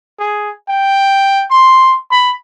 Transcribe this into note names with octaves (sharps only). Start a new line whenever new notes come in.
G#4
G5
C6
B5